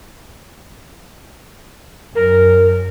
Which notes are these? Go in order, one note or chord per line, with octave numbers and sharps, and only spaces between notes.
F#2 A#4